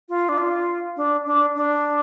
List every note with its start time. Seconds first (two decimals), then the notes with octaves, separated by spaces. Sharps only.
0.09 F4
0.29 D4
0.38 F4
0.97 D4
1.26 D4
1.55 D4